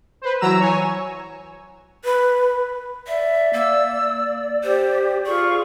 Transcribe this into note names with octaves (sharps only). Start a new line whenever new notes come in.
B4 C5
E3 F#3 A#5 E6 E7
C#5 G#5
B4
D5 E5
A#3 E6
G4 C5
F4 G#4 C#6